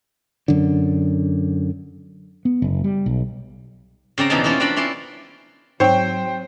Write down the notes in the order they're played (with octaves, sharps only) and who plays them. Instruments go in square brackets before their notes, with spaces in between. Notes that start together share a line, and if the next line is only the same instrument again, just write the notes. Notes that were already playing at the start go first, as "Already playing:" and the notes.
[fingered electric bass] F#2 D3
[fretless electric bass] B3
F#1
G3
B1
[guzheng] C#3 C4 D5 A#5
E2 B2 E3 F3 D#4 A5
F3 A#3 C#4 E4 F4
C4 D4 F4 A#4 D5 B5
C#4 E4 D5 C6
[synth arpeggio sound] G#2 [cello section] F#3 [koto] C4 C#5 [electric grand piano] C5 G5